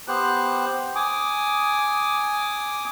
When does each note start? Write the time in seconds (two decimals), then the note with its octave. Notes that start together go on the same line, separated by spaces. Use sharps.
0.08 B3 G4 C5 F#6
0.95 G#5 D6 D#6